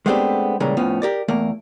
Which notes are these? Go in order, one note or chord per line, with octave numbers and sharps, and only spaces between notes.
G#3 A3 B3 C4 D4 G4
A#2 C#3 E3 G3 G#3 A#4
F2 A2 F3 B3 C#4
G4 A#4 D5
E2 A3 A#3 A#4